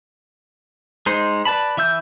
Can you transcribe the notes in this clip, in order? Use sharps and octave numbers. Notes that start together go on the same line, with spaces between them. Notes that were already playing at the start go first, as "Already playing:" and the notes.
G#3 D#4 C5
B4 D5 A5 B5
E3 E5 E6 G6